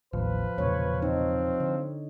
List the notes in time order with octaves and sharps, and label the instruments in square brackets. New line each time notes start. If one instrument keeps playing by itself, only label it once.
[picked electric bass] A1 D#2 [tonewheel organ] F3 [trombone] B4
[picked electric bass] E1 A#2 C#3 [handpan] C#5
[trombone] C4 [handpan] D#4
[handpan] D3